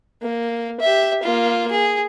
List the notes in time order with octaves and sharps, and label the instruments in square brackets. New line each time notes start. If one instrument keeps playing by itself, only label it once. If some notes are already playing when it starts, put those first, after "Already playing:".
[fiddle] A#3
G4 E5
A#3 F4
G#4